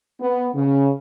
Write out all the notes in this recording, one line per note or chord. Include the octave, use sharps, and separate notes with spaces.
B3
C#3